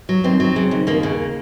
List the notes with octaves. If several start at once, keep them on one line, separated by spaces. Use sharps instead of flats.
F#3
D#2 C4
F#3
C#3
D#2
D#2 A#3
C#3